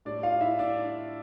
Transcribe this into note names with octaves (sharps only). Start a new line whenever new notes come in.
A2 G3 D4 D5
F4 F5
E4 E5
D4 D5